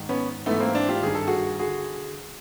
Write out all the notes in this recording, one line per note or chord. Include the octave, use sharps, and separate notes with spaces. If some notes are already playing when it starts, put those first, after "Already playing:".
Already playing: G#2 D#3
B3 C#4
G#2 E3 A3 B3
A#3 C4
C4 D4
F4 G4
G2 D#3 G#4
A4
F#4 G#4
D3 F#4 G#4